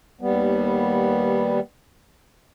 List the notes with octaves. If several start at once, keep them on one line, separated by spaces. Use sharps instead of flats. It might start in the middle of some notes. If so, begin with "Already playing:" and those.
D#2 G3 B3